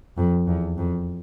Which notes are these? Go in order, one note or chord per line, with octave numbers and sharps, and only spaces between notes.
F2
E2
F2